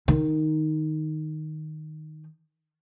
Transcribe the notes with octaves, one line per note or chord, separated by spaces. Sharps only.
D#3 D#4